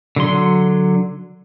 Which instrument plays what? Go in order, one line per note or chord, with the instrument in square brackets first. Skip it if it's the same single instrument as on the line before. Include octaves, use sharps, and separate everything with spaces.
[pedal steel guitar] D3 F#3 C6